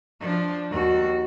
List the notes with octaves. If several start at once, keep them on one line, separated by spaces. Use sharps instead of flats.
F3 D4
D#2 F#4